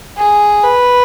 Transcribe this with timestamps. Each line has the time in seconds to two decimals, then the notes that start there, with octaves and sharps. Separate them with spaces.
0.18 G#4
0.63 B4